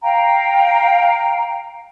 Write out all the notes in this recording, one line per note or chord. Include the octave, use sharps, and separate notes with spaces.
F5 G5 A#5